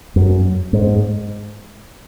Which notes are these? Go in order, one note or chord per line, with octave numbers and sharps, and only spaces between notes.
F#2
G#2